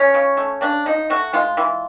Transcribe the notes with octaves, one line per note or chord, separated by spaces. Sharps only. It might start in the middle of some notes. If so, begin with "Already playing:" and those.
Already playing: F3 C#4
C#3
A3
C#3 D4
F3 D#4
A3 F#4
G#3 F4
E3